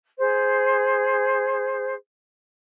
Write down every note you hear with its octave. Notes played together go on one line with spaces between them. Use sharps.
G#4 C5